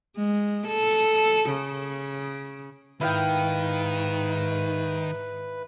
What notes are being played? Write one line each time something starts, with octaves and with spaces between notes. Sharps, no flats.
G#3
A4
C#3
G#2 D#3 E4 B4 F5 G5